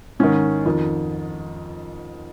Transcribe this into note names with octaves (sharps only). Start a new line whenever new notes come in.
G#2 D#3 C#4
F2 D#3